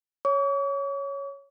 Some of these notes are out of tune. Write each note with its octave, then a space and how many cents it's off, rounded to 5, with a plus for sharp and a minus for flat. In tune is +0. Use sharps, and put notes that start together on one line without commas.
C#5 +0 C#6 +45